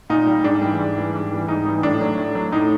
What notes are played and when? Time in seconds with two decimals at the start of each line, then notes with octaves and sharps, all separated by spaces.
0.10 A#2 D#4
0.27 G3
0.44 G#2 D4
0.61 E3 G3
0.79 G#2
0.97 E3 G3
1.14 G#2
1.32 E3 G3
1.48 G#2 D#4
1.65 E3 G3 D#4
1.83 A2 D4
2.01 F#3
2.18 A2
2.35 F#3
2.52 A2 D#4